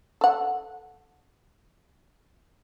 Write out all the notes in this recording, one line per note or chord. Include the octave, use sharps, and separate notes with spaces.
A4 F#5